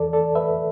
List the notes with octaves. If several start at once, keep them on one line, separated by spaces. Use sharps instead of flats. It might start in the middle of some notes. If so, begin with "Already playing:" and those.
Already playing: E2 E3 A4 D5
A4 D5
B4 E5